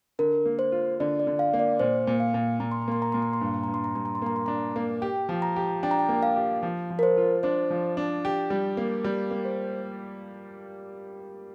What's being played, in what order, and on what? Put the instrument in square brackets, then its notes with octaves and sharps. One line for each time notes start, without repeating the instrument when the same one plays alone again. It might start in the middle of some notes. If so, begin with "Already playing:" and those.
[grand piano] D3 [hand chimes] A#4
[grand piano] A#3
[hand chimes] C5
[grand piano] F4
[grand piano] D3 [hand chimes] D5
[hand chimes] D5
[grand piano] D3
[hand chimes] F5
[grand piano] A#3
[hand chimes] D5
[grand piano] A#2 [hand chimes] C5
[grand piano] A#2
[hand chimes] F5
[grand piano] A#2
[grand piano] A#2 [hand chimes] A#5
[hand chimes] C6
A#5
[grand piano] A#3 [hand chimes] C6
[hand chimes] A#5
[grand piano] A#2 [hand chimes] C6
[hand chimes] A#5
C6
[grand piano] G2 [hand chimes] A#5
[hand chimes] C6
[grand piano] G2 [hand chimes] A#5
[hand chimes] C6
A#5
[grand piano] G2 [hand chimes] C6
[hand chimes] A#5
C6
[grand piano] A#3 [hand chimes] A#5
[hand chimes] C6
[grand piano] D4 [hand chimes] A#5
[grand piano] A#3
[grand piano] G4 [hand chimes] G5
[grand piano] F3
[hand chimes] A#5
[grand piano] G4
[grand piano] D4 [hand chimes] G5
[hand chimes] A#5
G5
[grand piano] A#3
[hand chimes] F5
[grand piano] G4
F3
F3
[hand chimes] A#4
C5
[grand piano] F4
[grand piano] D4 [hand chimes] C5
[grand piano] F3
D4
G4
G3
A#3
G3
A#3
[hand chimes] C5